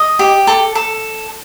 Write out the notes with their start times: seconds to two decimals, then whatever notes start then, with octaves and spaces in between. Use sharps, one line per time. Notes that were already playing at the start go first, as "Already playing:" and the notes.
Already playing: D#5
0.19 G4
0.47 A4
0.75 A4